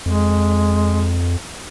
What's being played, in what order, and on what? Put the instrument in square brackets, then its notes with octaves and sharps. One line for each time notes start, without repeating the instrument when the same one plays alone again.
[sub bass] F2 [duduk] G#3